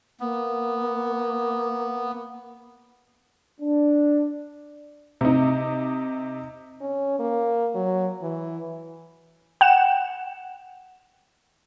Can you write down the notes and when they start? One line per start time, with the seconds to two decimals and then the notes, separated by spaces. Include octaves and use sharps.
0.20 A#3 B3
3.60 D4
5.21 C3 D#4
6.81 C#4
7.19 A#3
7.74 F#3
8.22 E3
9.61 F#5 G5 E7